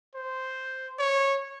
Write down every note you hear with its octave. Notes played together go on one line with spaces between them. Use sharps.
C5
C#5